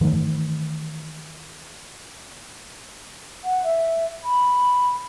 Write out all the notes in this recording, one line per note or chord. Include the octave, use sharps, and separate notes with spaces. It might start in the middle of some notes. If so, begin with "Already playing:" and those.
D#3 E3 A3
F#5
E5
B5